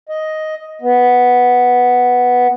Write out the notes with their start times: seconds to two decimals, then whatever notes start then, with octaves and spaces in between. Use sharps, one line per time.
0.09 D#5
0.82 B3